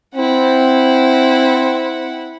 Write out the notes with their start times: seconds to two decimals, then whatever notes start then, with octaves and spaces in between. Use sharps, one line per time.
0.15 C4 E4 F#5